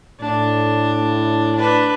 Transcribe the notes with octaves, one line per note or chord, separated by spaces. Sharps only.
A2 D4
D4 B4